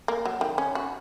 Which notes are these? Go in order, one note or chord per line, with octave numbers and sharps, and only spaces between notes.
A#3
F#3
D#3
C#4
F#4